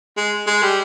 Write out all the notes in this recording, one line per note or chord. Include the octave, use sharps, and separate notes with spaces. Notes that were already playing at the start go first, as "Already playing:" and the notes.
G#3
G#3
G3